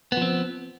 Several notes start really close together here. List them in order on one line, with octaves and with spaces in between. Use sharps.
B3 F3 C4